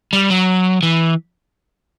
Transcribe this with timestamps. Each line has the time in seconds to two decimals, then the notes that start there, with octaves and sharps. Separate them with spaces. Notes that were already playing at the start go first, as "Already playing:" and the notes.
0.13 G3
0.30 F#3
0.83 E3